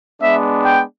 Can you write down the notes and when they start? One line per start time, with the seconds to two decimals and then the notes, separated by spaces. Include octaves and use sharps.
0.21 G#3 B3 D4 E5
0.65 G5